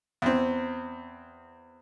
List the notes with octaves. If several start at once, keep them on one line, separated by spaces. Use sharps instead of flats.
E2 C4